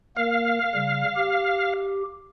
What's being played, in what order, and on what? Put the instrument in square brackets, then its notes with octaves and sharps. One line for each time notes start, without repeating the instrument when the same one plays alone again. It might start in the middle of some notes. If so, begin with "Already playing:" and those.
[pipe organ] A#3 A#4 [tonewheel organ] F5
[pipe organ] C#3 G3
G4